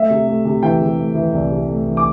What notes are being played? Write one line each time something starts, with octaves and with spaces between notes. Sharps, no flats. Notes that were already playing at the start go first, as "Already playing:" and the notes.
Already playing: A3 E5
C3
A3
C3
E3 G5
C3
A3
E3
C2
C3
A3
E3
D6